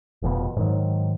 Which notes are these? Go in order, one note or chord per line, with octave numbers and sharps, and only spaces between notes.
F1 F2 B2
G#2 D#3 F#3